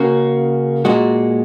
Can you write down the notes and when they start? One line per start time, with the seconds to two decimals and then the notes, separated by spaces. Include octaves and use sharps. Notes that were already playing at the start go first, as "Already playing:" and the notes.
Already playing: C#3 A#3 F#4
0.85 A#2 G#3 F#4